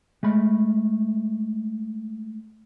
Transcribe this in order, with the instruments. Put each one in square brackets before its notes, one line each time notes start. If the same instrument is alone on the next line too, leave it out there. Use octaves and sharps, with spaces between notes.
[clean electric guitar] G#3 A3 B5